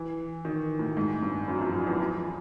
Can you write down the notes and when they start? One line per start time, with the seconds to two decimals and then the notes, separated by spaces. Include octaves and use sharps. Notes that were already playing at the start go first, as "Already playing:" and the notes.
Already playing: E3
0.45 D#3
0.79 A2
0.97 G#2
1.22 G2
1.48 F#2
1.61 F2
1.73 F#2
1.87 E2
1.99 F2